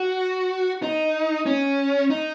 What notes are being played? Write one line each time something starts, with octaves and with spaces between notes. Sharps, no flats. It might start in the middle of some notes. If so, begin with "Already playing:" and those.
Already playing: F#4
D#4
C#4
D#4